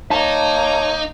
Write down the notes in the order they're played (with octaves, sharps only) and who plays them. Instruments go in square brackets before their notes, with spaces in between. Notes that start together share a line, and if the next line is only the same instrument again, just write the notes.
[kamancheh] A#3 D6 [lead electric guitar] D#4 [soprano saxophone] C#5 [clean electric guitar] A5